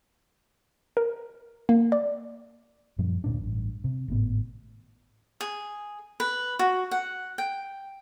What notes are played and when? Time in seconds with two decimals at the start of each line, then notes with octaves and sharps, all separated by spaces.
0.97 A#4
1.69 A#3
1.92 D5
2.98 F#2 A#2 F3 G3
3.24 D2 A#2 D4
3.40 A1 G2
3.84 C3
4.08 G#1 A2 B3
5.41 G#4
6.20 B4
6.59 F#4
6.91 F#5
7.38 G5